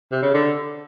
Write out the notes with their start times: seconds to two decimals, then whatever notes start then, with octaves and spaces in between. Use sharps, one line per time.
0.12 C3
0.22 C#3
0.34 D3